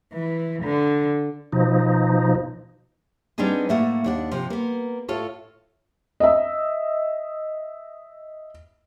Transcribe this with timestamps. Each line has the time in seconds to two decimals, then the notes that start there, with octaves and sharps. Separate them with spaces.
0.13 E3
0.63 D3
1.52 B2 F3 D#4
3.38 G3 B3 C4 D4 D#4 G#4
3.69 A2 A3 A#3 F#5
4.04 D#2 D4 F#5
4.32 C3 F3
4.50 A#3 B3
5.08 A2 F4 A4 C#5
6.20 D#5 E5